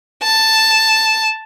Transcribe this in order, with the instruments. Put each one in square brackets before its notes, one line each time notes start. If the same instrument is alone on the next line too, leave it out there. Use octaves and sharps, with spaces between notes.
[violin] A5